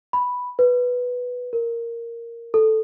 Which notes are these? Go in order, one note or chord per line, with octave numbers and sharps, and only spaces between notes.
B5
B4
A#4
A4